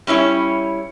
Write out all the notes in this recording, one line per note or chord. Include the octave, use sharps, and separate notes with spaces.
G3 C#4 E4 C#5